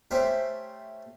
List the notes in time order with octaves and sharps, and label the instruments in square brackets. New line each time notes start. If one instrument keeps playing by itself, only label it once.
[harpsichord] A3 C#4 G4 C5 E5